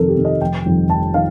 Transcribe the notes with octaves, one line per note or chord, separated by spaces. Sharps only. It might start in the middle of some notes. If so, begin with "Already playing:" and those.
Already playing: F2 C3 D#3 A4 A#4
G4
C3 D#3
D#5
F1 G5
F2 D#3 G3
F1 A5
D#3 F5